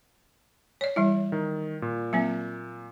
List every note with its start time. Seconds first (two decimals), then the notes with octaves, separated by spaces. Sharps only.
0.81 C#5 D5
0.96 E3 G3 E4
1.32 D#3
1.82 A#2
2.13 F#3 A#3 C4